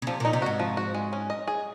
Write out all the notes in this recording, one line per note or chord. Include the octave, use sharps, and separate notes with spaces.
C#3
C3 F3
A#2
D#4
C3
G#2 F#4
F3
F#4
G#3
C#4
D#5
G#4